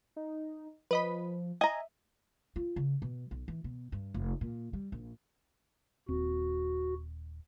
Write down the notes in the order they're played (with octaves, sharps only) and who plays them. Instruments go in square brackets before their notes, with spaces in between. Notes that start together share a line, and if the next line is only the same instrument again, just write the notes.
[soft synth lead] D#4
[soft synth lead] F3 [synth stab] B4 D#5 B5
[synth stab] D#5 [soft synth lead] E5 [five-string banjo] G#5 A#5
[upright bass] F4
C#3
B2
B1
E3
B2
G2
F1
A#2
G3
A#1
[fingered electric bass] D#1 C4 [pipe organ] F#4